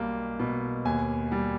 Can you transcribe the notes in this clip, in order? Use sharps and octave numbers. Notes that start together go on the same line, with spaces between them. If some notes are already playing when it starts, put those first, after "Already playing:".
Already playing: B1 G3 A#3
B2
D#2 G#5
G3